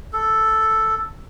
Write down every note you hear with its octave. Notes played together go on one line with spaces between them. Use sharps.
A4